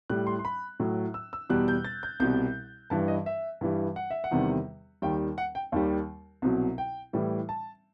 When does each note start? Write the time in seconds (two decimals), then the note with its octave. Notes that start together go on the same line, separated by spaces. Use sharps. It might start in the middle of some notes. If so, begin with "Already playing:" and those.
0.10 A2 G3 F#6
0.27 C6
0.39 C6
0.45 B5
0.80 A2 F#3
1.14 E6
1.33 E6
1.50 E2 B2 G3 F#6
1.68 G6
1.85 A6
2.03 G6
2.20 C2 B2 G3 G6
2.90 G2 E3 G3 A5
3.08 D#5
3.26 E5
3.61 G2 E3 G3
3.96 F#5
4.11 E5
4.24 F#5
4.31 E2 C3 D#3 G3
5.02 D#2 D#3 G3 G5
5.38 F#5
5.55 G5
5.72 D#2 D#3 G3
6.42 C2 B2 F#3
6.78 G5
7.13 A2 E3 G3
7.49 A5